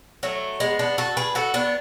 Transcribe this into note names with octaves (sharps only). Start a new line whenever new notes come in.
F#3 A3
G#3 B3
B3 D4
F#4 A4
G#4 B4
F#4 A4
B3 D4